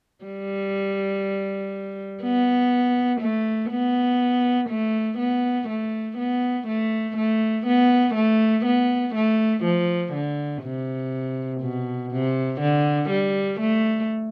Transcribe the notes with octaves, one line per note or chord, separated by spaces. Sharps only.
G3
B3
A3
B3
A3
B3
A3
B3
A3
A3
B3
A3
B3
A3
F3
D3
C3
B2
C3
D3
G3
A3